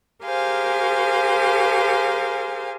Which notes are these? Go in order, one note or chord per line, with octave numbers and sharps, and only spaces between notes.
G4 G#4 A#4 C5 F5 G#5